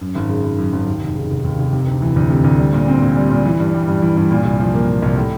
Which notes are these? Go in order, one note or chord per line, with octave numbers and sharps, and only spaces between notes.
F#2
G#1
C#3
G#1
F#2
G#1
D#2
F1
C#3
F1
D#2
F1
C3
D2
E3
D2
C3
D2
G3
A#2
C4
A#2
G3
A#2
E3
G2
G3
G2
E3
G2
A#2
C2
F3
A#3
A#2
C2
A2